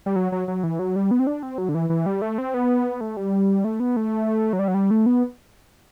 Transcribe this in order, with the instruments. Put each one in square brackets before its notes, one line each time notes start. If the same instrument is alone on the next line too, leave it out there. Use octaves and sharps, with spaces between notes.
[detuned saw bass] G3
F#3
F#3
F#3
E3
F#3
G3
B3
C4
D4
C4
F#3
D3
E3
E3
G3
A3
C4
B3
A3
G3
A3
B3
A3
F#3
G3
F#3
G3
A3
B3